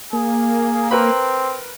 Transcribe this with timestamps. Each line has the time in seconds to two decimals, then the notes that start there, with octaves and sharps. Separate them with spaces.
0.13 A#3 G#4
0.91 C4 A#4 B4 B5